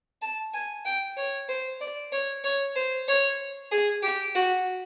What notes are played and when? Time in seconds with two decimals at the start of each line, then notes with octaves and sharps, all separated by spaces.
0.22 A5
0.54 G#5
0.85 G5
1.17 C#5
1.48 C5
1.81 D5
2.12 C#5
2.44 C#5
2.76 C5
3.08 C#5
3.71 G#4
4.03 G4
4.35 F#4